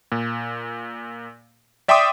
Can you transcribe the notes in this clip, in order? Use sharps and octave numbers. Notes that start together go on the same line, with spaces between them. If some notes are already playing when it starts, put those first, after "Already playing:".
A#2
D5 E5 G5 C6 D6 D#6